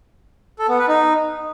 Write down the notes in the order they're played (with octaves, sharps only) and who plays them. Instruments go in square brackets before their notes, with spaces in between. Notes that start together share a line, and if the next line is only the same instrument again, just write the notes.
[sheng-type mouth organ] A4
B3
B4
D#4